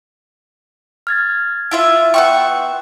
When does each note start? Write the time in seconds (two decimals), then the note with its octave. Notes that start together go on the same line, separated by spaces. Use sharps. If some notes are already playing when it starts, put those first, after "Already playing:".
1.07 F6 G#6 A6
1.71 E4 F4 E5
2.14 B3 E5 G5 C6 C#6